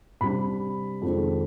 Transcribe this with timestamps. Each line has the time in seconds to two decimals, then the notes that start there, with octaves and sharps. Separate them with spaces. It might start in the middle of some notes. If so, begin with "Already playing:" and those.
0.21 C3 G3 D4 B5
1.02 F2 D#3 G#3 D4